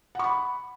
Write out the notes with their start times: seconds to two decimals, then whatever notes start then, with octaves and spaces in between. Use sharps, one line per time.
0.15 F#5
0.19 C#6
0.24 B5